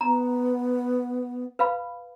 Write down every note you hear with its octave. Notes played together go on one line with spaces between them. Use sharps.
B3 A#5
B4 F5 B5